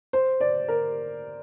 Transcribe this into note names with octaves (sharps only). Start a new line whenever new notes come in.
C5
D5
A#4